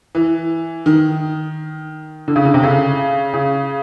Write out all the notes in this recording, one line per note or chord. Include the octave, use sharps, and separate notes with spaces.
E3
D#3
D3
C#3
D3
C3
C#3
C#3